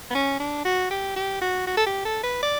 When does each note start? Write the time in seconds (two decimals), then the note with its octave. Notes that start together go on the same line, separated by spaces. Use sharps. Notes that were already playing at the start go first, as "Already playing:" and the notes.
0.11 B3
0.15 C#4
0.40 D4
0.65 F#4
0.90 G4
1.16 G4
1.41 F#4
1.67 F#4
1.77 A4
1.86 G4
2.05 A4
2.24 B4
2.43 D5